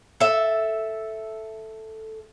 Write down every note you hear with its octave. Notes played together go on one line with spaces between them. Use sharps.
A4 E5